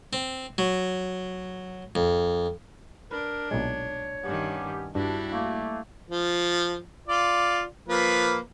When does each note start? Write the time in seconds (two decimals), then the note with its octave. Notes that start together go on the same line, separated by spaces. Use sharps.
0.13 C4
0.58 F#3
1.95 F2
3.11 D4 A#4 B4
3.51 B1 A#2 G#3 C#5
4.24 G2 D#3 B3 C#4 G4
4.95 G2 G3 D4 E4 F#4 G4
5.32 A3 A#3
6.11 F3
7.08 F4 D5
7.88 F3 A#3 B4